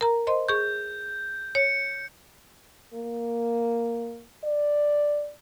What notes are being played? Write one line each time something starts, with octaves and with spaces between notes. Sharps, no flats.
A#4 A#5
C5 D#5 C6
G#4 C#6 G6
C#5 C#7
A#3
D5